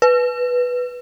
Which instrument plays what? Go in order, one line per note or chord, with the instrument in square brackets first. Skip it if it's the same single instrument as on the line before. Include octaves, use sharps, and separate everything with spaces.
[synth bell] B4